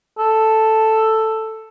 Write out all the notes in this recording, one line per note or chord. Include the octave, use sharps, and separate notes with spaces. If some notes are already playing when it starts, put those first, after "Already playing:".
A4